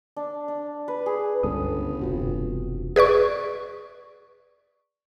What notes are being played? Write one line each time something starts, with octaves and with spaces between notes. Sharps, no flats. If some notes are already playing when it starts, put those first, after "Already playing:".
D4
D4
B4
G#4
G1 C#2 G2 C#4 A4 D#6
E1 G2 C3 F4 F#4
G#4 B4 D5 C#6